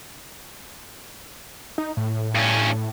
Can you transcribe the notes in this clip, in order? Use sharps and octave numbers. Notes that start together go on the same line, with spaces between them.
D#4
A2
G2 C#4